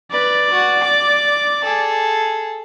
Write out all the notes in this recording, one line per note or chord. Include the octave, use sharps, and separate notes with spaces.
B4 D5
F#4
D6
G#4 A4